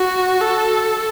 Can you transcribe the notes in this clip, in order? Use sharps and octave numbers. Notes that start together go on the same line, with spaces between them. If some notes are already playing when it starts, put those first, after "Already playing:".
Already playing: F#4
A4